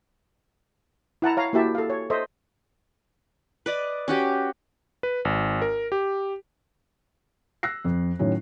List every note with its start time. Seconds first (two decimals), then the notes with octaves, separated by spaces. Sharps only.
1.22 E4 F#5 A5 A#5
1.37 C#5 F5 A#5
1.53 A#3 E4 F#4 G4 E5 A5
1.75 A4 F5
1.90 C#5
2.10 A4 C5 D#5 E5
3.66 B4 D5 D#5
4.08 C#4 F#4 G4
5.03 B4
5.25 G#1
5.62 A#4
5.92 G4
7.63 E6 F#6 A#6 C7
7.85 F2
8.19 A2 D#3 F#3 C#4 E4